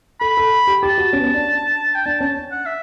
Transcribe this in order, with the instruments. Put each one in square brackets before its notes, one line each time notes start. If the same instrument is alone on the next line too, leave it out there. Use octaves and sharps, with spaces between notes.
[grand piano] A4 [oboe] B5
[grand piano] A4
G4
[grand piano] G4 [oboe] A5
[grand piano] F#4
C#4
B3
C#4
D4
[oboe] G5
[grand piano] D4 [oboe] A5
[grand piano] C#4 [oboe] A5
[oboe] F#5
E5